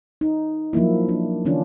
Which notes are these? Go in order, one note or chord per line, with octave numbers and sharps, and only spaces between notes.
D#4
F3 F#3 A#3 E4
D4
D3 E3 C#4 D4 F4